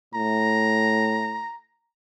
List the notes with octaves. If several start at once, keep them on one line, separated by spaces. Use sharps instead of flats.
A2 A#5